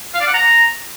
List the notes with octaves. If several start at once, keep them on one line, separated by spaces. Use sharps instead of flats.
F5
D5
F#5
A#5